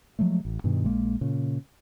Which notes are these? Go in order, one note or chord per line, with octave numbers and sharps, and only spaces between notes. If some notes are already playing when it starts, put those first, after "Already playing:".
F3 F#3 G#3 A3
A1
G2 B2 D#3
A#1 G#3 A#3
A#2 C#3